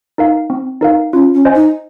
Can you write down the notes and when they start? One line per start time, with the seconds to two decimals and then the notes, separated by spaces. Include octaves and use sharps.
0.18 D#4 A#4 F5
0.50 C4
0.81 D#4 A#4 F5
1.13 C#4 F4
1.34 C#4
1.45 C5 D#5 G#5
1.55 D#4